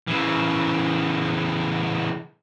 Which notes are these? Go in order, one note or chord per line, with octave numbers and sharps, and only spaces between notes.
C#3 E3